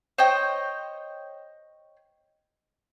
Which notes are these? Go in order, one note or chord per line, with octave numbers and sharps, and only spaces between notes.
C5 C#5 D#5 G5